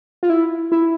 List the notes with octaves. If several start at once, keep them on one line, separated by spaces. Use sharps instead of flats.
F4
E4
E4